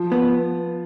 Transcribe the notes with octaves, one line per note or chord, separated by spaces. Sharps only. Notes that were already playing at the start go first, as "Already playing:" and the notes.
Already playing: F3
B3